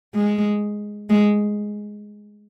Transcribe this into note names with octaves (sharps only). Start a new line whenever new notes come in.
G#3
G#3